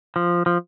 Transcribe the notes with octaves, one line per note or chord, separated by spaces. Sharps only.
F3
F3